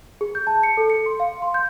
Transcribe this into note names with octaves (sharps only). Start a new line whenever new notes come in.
G#4
G6
A5
C#7
A4
C#7
C6
F5
C6
G6